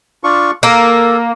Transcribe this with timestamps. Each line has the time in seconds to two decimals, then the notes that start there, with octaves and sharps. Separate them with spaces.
0.24 D4 F4 C#6
0.63 A#3 A4